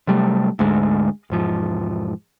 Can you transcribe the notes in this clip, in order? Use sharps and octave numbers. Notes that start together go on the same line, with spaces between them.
C3 F#3 G3 A3
D2 G#2 G#3
E1 G#2 F3